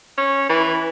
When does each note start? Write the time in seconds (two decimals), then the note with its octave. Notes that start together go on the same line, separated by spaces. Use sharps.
0.18 C#4
0.50 E3